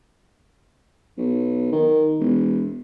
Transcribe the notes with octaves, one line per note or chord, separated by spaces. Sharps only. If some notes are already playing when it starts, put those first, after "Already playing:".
B1
D#3
E1